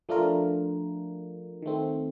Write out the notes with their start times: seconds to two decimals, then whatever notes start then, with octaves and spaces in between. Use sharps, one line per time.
0.09 F3 A3 D4 F4 A#4
1.62 D#3 A3 C4